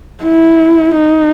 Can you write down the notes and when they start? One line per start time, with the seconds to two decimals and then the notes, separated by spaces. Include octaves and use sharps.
0.24 E4
0.95 D#4